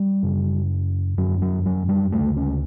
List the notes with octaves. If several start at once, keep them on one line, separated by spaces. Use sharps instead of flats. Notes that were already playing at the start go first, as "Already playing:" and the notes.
Already playing: G3
F#2 C#3
F#2 D3 F#3
F#3
F#3
G3
D2 C#3 A3
C#4